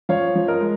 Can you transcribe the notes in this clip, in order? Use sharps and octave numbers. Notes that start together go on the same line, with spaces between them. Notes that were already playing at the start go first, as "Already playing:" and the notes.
F3 C#5 F5
F3
A#4 D#5
G#3